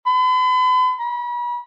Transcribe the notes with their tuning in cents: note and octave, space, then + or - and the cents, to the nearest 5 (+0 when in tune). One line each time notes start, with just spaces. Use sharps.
B5 +45
B5 -40